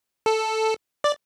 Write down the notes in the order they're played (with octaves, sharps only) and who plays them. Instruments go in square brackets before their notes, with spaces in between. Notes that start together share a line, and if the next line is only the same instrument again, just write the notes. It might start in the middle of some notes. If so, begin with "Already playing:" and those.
[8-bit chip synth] A4
D5